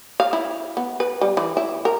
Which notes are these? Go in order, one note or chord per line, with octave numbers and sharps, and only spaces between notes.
F5
E4
B3
B4
G3
E3
E4
A#4